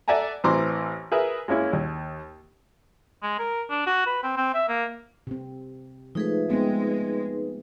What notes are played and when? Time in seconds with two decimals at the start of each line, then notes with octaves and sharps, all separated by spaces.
0.08 A4 D5 E5 F#5 G#5 A#5
0.44 A1 E3 C4 A#5 C6 D6
1.12 G#4 A#4 B4 E5
1.48 G#3 A#3 C#4 E4
1.73 D#2
3.22 G#3
3.39 A#4
3.70 D4
3.87 F#4
4.06 B4
4.23 C4
4.37 C4
4.54 E5
4.69 A#3
5.27 C3 C4
6.15 F3 G#3 A3 D#4 G#4 B4
6.50 G#3 B3 C4